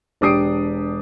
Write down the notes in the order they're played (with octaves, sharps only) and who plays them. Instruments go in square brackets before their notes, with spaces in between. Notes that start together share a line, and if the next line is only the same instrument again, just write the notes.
[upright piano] E1 D4 G4 D#6 C7 D7